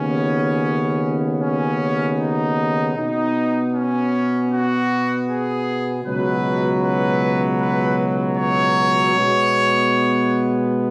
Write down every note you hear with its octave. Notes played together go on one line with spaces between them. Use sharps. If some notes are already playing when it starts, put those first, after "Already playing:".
Already playing: D#2 C#3 B3 C#4
C#4
D#4
B2 B3 D#4
C#4
F#4
G#4
C#2 B2 F#3 B4
B4
B4
C#5
B2 G#3 B3